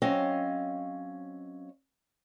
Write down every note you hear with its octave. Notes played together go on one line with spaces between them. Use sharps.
F#3 C4 C#4 D#5 F5